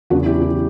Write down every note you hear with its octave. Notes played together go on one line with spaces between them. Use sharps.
E2 C#3 F#3 D4 F#4
E4 G4
E4 G4